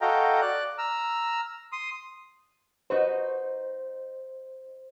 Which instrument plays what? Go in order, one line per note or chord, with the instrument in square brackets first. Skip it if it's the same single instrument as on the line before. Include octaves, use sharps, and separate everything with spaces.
[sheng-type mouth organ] F#4 A4 D#5 F5 G5 A#5
D5 F#6
A#5 E6 F6
C6 D#6
[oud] D#4 F#4 B4 [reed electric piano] C5